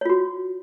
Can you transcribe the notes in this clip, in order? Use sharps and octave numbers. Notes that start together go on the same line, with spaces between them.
F4 F#4 C#5